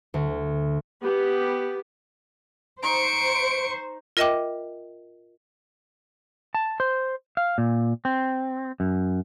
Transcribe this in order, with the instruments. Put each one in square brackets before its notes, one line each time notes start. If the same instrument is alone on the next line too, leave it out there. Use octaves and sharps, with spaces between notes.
[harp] D2
[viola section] B3 G4
[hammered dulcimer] D#4 [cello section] C5 [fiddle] C#6 [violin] D7
[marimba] F4 A#4 D#5 E5 G5 D6
[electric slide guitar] A5
C5
F5
A#2
C4
F#2